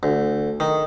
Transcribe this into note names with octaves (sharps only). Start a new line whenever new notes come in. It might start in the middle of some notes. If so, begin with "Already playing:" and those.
D2
D#3